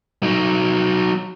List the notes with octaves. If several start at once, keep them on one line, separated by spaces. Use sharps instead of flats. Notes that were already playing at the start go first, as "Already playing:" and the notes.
F#3 D#4